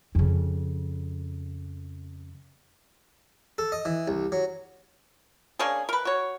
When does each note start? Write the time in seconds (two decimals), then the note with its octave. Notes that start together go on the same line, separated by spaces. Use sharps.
0.15 F2 C#3
3.58 A4
3.72 D#5
3.85 E3
4.08 C2
4.32 F#3
5.59 A#3 C#4 D4 G#4
5.89 A#4 B4
6.05 F#4 C#5